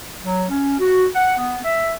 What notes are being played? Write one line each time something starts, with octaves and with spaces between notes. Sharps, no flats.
F#3
C#4
F#4
F#5
B3
E5